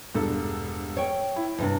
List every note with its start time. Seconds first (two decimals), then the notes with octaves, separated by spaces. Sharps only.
0.14 E1 G2 A4
0.97 C#5 G5
1.36 E4
1.58 E2 G2 C3